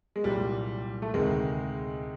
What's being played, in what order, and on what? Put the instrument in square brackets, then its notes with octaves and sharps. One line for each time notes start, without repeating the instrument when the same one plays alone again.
[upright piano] G#3
[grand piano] C2 A#2 F#3 [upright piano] G3
[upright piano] A3
[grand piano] D2 C3 D#3 [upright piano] G#3